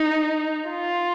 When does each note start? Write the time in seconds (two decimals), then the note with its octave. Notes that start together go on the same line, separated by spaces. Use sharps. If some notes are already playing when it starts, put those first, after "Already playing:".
Already playing: D#4
0.69 F4